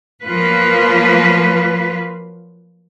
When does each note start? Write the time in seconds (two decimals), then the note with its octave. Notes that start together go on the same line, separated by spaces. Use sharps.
0.24 F3 F#3 A#3 F4 B4